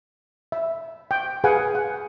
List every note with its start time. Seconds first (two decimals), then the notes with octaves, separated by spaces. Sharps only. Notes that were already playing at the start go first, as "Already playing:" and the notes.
0.52 E5
1.11 G5
1.44 G#4 B4 F5 F#5 G#5
1.75 F#5